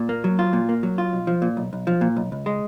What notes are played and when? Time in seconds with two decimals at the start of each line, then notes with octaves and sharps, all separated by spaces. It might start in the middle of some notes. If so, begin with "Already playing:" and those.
Already playing: A#2
0.09 A#3
0.24 F#3
0.39 F4
0.53 A#2
0.69 A#3
0.83 F#3
0.98 F4
1.13 B1
1.27 F3
1.42 A#2
1.57 B1
1.73 B1
1.87 F3
2.01 A#2
2.17 B1
2.32 C#2
2.46 G#3